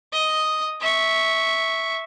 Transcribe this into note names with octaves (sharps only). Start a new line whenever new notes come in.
D#5
E5 C#6